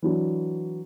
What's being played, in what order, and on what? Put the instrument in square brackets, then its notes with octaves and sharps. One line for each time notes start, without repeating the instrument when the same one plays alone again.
[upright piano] E3 F#3 D4